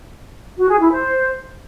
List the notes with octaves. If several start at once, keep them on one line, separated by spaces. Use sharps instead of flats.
F#4
G#4
E4
C5